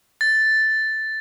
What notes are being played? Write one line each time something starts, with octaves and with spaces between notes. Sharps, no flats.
A6